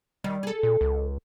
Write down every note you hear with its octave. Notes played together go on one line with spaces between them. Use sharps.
D#3 G3
G#4 A4
A#2
C#2